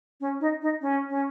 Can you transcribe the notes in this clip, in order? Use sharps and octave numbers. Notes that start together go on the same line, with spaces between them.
C#4
D#4
D#4
C#4
C#4